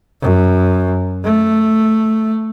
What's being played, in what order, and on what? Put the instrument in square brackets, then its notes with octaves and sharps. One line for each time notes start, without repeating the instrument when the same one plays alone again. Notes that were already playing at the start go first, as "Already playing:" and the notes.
[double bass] F#2
A3